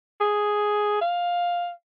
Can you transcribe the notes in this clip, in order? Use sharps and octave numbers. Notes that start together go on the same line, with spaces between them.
G#4
F5